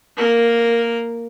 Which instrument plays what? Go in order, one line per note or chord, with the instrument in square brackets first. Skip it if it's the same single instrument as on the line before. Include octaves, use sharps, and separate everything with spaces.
[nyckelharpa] A#3 A#4